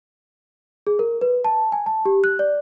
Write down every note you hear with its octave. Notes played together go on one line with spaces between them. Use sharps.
G#4
A#4
B4
A5
G#5
A5
G4
F#6
D5